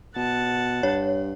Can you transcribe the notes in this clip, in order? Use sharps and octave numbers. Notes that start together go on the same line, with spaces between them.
B2 F#5 A5
G2 C#5